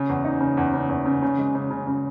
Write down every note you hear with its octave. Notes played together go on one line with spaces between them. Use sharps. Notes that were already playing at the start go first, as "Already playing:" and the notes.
Already playing: C#3
E2
D#4
C#3
E2
C#3
E2
C#3
C#3
G#3
C#3
C#3
C#3